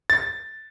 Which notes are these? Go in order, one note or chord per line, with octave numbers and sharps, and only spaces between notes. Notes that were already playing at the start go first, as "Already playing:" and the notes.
A6